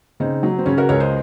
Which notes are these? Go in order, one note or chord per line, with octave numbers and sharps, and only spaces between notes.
C#3 C4 D#4
F#3
C4
C#3 C#4
F#4 A#4
C#2 A#4 C#5
C5 D#5